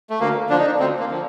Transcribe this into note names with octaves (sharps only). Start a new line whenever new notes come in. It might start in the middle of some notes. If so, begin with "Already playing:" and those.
A3
D2 A#3
D3 F3 D4
D#4
D4
D2 C4
A#3
D3 F3